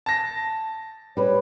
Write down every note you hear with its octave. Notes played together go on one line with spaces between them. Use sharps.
A5 A#6
G3 B4 C#5